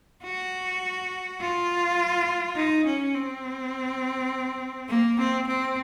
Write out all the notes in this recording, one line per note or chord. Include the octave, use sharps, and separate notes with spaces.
F#4
F4
D#4
C#4
C4
A#3
C4
C4